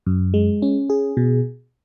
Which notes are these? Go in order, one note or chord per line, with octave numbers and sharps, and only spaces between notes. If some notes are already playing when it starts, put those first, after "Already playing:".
F#2
G#3
C#4
G#4
B2